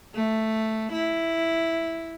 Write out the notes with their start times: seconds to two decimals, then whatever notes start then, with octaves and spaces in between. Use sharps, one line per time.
0.15 A3
0.93 E4